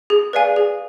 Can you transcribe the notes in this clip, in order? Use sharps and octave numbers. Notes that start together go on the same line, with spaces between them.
G#4
B4 D5 F5 G#5
G#4